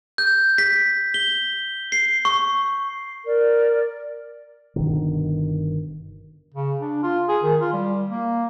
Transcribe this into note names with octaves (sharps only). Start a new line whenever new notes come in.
G6
B6
G7
C7
C#6
A#4 D5
G1 B2 D3 D#3
C#3
D4
F4
G#4
D#3
F4
G3
A#3